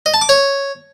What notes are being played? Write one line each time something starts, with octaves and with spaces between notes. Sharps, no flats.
D#5
A5
D6
C#5